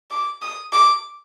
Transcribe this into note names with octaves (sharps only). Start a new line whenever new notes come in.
D6
D#6
D6